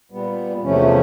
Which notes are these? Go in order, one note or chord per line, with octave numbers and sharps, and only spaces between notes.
A#2 G3 B3
E2 C3 F3 A3 C#4